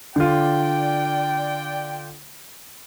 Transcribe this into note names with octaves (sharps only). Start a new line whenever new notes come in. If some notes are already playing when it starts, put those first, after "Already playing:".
D3 F4 D5 G5